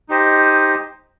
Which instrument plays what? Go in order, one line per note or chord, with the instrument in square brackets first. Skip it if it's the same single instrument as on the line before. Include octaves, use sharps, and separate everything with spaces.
[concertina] D#4 G4 C5 D#5